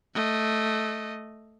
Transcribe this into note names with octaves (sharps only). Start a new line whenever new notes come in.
A3 D#5